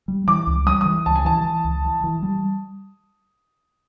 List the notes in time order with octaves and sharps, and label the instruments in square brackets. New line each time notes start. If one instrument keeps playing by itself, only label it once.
[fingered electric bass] G3
[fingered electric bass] E3 [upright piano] D6
[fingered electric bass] C#2
[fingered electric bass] G3 [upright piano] D#6
[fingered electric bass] E3 [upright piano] D#6
[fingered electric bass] C#2 [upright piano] A5
[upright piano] G#5
[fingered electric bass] E3 [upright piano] A5
[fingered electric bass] E3
C#2
E3
E3
G3